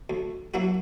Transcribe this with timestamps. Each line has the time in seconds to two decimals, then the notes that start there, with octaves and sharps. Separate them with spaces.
0.10 D2
0.54 F#3 A#3 D4 E4 F#4